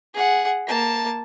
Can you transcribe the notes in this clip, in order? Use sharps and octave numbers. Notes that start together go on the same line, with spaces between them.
G#4 F#5
A#3 A5